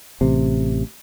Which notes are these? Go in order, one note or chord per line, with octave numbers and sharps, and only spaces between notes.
A1 C3